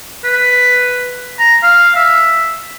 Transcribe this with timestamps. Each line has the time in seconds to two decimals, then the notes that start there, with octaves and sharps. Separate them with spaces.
0.24 B4
1.40 A#5
1.63 F5
1.96 E5